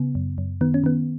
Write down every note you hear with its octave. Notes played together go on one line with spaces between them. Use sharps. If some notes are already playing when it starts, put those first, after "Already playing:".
Already playing: C#3 B3
F#2
F#2
D#3 B3
C#4
D#3 B3